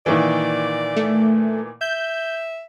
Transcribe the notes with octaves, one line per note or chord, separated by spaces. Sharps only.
A#2 D#3 E3 D5
A3
E5 G6